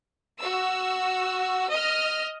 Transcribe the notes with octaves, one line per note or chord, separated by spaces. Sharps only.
F#4 E6
D#5 F6